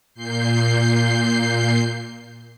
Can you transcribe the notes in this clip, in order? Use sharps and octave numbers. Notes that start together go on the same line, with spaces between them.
A#2 G6 C7